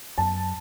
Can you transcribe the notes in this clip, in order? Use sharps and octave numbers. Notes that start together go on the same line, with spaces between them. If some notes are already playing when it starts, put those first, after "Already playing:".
F#2 A5